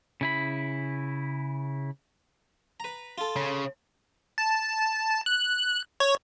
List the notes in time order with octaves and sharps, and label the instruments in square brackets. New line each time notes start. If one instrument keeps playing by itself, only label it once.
[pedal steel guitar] C#3 E4 B5
[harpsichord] B4 A#5
F4 A4
[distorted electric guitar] C#3
[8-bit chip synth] A5
F#6
C#5